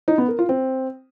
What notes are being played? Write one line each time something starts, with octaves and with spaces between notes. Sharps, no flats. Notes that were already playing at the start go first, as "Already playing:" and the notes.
D#4
B3
A#4
F4
C4